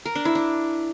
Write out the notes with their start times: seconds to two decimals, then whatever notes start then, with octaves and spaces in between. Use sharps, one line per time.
0.05 A#4
0.15 D4
0.25 E4
0.35 D4